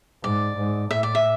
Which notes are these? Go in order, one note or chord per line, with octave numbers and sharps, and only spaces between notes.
G#2 D5
G#2
A2 E5
D5
E5